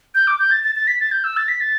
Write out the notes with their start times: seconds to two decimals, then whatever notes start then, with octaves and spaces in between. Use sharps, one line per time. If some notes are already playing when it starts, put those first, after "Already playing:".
0.15 G6
0.27 D6
0.39 G6
0.51 A6
0.64 A6
0.76 A6
0.88 B6
1.00 A6
1.12 G6
1.24 E6
1.37 A6
1.48 B6
1.60 A6